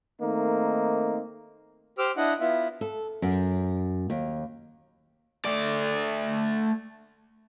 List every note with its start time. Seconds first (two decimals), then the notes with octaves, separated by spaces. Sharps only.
0.21 D#3 A3 A#3 C4 D#4
1.98 G4 C5 D6 E6 F6
2.17 D4 E4 D#5 F#5
2.40 B3 E4 F4 E5
2.81 A4
3.22 F#2
4.10 D#2
5.45 A3 D5